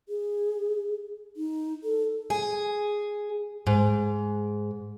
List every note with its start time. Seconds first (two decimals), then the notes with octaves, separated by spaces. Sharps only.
0.09 G#4
1.37 D#4
1.84 A4
2.30 G#4
3.67 G#2